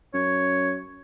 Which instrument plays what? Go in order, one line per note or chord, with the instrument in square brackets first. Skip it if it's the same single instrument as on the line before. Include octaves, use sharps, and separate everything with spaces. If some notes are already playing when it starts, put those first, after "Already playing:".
[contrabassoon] F#2 [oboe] C#5